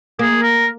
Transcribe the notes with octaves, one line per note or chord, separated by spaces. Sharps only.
A#3 G#4
A#4